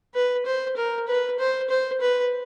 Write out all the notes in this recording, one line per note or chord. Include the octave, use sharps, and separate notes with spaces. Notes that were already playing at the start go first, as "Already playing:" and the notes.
B4
C5
A#4
B4
C5
C5
B4